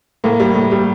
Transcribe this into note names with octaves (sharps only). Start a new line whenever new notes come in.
A2 A#3
G3
A2
G3